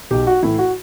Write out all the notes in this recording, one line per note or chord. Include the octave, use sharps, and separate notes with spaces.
B1 G4
F#4
A2 E3 E4
F#4